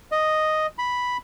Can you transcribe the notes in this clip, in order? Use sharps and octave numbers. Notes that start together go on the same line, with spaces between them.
D#5
B5